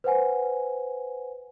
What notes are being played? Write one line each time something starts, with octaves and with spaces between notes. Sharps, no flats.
B4 C5 F#5 G#5